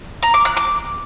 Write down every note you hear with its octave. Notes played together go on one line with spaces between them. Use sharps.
A#5
D6
F#6
D6